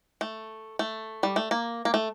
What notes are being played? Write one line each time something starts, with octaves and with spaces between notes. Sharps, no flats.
A3
A3
G3
A3
A#3
A#3
A3